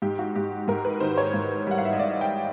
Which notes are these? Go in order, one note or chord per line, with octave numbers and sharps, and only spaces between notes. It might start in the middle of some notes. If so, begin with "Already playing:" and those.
G#2 G4
F#4
G#2 G4
G#2 A#4
B4
D#3 C5
C#5
G#2
G3 F#5
F5
E5
D#5
G#2 D5
G5